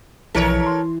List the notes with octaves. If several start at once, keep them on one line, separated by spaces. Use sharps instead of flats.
B1 E3 F3 A4 A#4 C#5 B6
C6